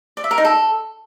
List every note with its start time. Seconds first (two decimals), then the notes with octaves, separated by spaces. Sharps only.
0.17 D5
0.24 E5
0.31 A#4
0.38 D#4
0.45 A4